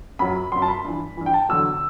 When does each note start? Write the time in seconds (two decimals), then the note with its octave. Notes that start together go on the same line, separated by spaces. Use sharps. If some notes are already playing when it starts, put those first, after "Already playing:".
0.19 F#2 F#3 B5
0.52 F#2 F#3 C6
0.62 A5
0.68 B5
0.84 G2 E3
1.17 G2 E3
1.26 G5
1.34 A5
1.49 E2 D3 F#3 E6